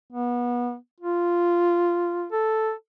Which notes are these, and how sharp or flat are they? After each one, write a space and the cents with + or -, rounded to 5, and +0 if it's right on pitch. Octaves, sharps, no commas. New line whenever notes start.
B3 -25
F4 -5
A4 +0